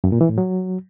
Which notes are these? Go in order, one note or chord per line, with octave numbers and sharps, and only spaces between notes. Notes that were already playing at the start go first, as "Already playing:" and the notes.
F#2
A#2
E3
A2
F#3